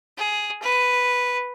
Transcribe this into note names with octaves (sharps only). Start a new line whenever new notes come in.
G#4
B4